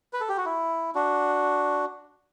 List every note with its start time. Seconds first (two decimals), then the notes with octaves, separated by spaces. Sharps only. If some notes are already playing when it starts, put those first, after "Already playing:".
0.13 B4
0.21 A4
0.29 G4
0.37 F#4
0.46 E4
0.95 D4 F#4